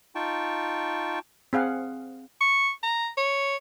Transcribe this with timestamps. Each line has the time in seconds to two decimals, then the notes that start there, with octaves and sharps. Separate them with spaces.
0.15 D#4 F4 G5 A5 C#6
1.53 C4 G#4 F5 F#5
2.41 C#6
2.83 A#5
3.17 C#5